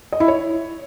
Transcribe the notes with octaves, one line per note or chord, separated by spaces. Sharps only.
D#5
E4
C#5